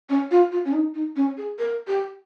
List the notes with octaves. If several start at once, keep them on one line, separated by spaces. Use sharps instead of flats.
C#4
F4
F4
C#4
D#4
D#4
C#4
G#4
A#4
G4